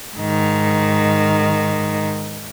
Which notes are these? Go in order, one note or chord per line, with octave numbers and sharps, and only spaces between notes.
G#2 D#3